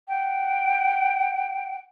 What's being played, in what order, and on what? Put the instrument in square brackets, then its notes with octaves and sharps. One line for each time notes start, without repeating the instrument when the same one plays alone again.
[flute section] F#5 G5